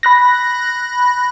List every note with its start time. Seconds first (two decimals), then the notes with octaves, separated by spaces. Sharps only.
0.03 B5 F#6 A#6